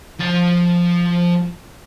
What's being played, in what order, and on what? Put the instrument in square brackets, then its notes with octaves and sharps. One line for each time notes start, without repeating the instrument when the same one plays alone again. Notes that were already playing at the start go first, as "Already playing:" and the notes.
[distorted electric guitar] F3 A5